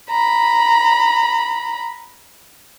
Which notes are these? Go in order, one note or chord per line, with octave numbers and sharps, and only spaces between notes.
A#5 B5